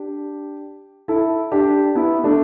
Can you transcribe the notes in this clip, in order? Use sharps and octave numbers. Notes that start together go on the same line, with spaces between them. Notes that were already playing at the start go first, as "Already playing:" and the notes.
Already playing: D4 G4
E4 A4
D4 G4
B3 E4
A3 D4